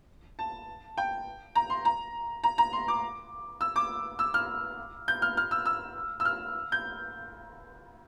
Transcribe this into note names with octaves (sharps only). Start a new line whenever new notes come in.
A5
G5
A#5
C6
A#5
A#5
A#5
C6
D6
E6
D6
E6
F6
G6
F6
F6
E6
E6
E6
F6
G6